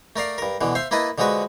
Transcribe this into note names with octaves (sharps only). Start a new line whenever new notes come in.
A3 A#4 D5 F5
G2 A#4
B2 D3 E3
C5 E5 F5
A#3 E4 B4 D#5 A5
D3 F3 G#3 F#4 B4